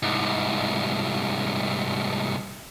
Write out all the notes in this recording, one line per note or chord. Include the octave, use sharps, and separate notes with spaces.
C2 G#2